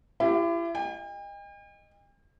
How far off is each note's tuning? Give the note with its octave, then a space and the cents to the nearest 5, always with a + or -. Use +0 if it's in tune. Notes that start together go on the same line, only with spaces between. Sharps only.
E4 +40 G4 +5
D#5 -10 G5 +45